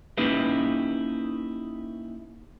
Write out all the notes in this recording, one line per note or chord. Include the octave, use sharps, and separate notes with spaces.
A#3 C#4 D#4 E4 G4 B4